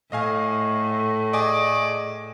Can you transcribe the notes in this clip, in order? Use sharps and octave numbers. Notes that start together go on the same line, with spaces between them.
A2 A3 D#5 F5 G#5
G#4 D5 D#5 G#5